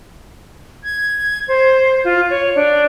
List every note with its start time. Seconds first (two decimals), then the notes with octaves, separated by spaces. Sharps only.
0.84 G#6
1.48 C5
2.04 F4
2.30 C#5
2.56 D4